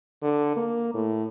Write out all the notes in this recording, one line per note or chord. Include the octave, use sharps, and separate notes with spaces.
D3
A#3
A2